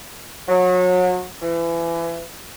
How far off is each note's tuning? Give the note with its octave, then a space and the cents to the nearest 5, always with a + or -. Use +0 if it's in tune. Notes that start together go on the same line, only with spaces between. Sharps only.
F#3 -30
E3 +30